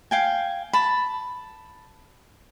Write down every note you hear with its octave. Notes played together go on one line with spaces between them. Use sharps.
F5 G5 G#5
A5 B5